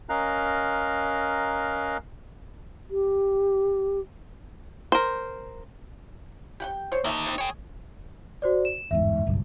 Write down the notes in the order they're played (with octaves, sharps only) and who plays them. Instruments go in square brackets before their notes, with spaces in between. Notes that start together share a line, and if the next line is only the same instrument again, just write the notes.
[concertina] C#4 A#4 D#5 F5 A#5 F#6
[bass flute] G4
[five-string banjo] A#4 C5
[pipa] G4 F#5 G5
C5 C#5
[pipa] D#3 A3 E5 [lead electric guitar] A#3 D#4
[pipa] C3 C4
[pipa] G#4 [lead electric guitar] C#5 G5
[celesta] F#4 C5 D5
E7
[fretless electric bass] G1 E2 G#2 [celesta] E5
[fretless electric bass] F#1 B1 G2